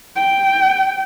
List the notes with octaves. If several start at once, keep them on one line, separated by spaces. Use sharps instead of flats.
G5